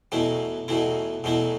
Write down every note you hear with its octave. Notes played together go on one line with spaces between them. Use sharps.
E2 B2 F#3 A3 E4
E2 B2 F#3 A3 E4
E2 B2 F#3 A3 E4